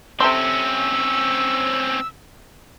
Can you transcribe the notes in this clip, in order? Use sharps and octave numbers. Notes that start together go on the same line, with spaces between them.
C3 C4 C#4 A4 C6 E6